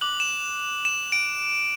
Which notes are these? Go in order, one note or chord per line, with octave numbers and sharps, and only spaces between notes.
D6 F#6 F#7
E7
E7
D7